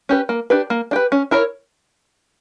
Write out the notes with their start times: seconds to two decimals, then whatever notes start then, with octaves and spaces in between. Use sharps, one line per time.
0.09 C#4 G4 B4
0.29 A#3
0.50 D4 G4 B4
0.70 A#3
0.91 D4 G4 B4
1.12 C#4
1.31 E4 A#4 C#5